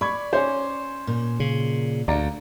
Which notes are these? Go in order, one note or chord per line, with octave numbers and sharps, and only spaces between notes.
D5 B5 C#6 G#6
C#4 C5 C#5 G#5
A#2
C#3
D2 D5 F5 A#5